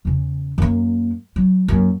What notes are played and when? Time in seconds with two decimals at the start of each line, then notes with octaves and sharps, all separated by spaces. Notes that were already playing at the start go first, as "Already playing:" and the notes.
0.05 E2 C#3
0.58 F#2 A#3
1.36 F#3
1.68 F#2 A#3